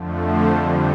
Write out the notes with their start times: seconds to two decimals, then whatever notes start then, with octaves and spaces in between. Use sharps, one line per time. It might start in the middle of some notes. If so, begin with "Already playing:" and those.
Already playing: F2 D3 F3 A3
0.20 C5
0.49 F2 D3 G3